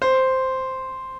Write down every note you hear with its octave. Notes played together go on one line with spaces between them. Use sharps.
C5